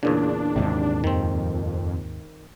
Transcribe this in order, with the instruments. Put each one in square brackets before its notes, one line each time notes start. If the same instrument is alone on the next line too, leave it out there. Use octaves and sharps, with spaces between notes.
[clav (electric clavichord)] E2 A#2 C#3 [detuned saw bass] D4
[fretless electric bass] D#2 G#2 C3
[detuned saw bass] F2 [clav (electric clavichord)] D#3 C4